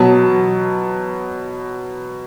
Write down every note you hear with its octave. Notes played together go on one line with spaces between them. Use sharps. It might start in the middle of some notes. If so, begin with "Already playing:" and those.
Already playing: B2 F#3 A5